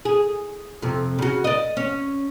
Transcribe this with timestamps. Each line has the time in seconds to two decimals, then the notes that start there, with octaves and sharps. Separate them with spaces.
0.05 G#4
0.82 F2 C3
1.19 C#3 F#4
1.44 D5 D#5
1.77 C#4